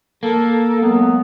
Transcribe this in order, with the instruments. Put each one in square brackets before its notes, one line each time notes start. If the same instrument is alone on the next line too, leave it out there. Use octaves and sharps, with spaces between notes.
[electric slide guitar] A#3 [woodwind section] A4
[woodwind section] F#3 G#3 B3